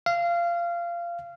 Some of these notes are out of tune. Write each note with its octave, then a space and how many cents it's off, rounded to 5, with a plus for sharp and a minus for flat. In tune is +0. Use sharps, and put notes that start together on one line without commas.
F5 -20